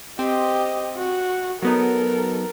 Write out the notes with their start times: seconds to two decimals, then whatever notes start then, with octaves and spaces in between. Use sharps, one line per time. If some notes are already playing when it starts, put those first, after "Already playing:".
0.19 C4 G4 D#5
0.97 F#4
1.62 F#3 B3 D#4 A4 A#4